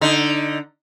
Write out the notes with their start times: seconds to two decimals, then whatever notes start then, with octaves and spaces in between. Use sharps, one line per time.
0.01 D3 D#4